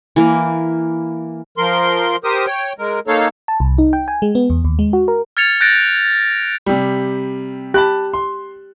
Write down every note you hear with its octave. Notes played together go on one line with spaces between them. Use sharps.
E3 A#3 A#4
F3 A#4 C6
G4 A#4 C5 D#6
C#5 G5
G#3 A#4
A#3 D#4 A4 C#5 F5
A5
C2
D#4
G5
G#5
G#3
B3
E2
D#2
G#3
F#4
A#4
F6 G#6 A6 C#7 F7
F#6 G6 A6 A#6 D7
C3 G3
G4 A5 B5 F#6
C6